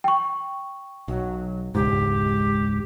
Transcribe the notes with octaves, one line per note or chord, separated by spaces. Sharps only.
G5 C#6
B1 F#3
E1 C#2 G#2 G4